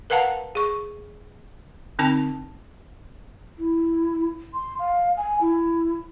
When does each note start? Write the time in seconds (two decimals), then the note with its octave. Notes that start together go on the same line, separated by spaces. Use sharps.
0.10 A#4 B4 F5 F#5 A5 A#5
0.55 G#4 C#6
1.99 D3 C4 D#4 A5
3.58 E4
4.53 C6
4.79 F5
5.17 G#5
5.41 E4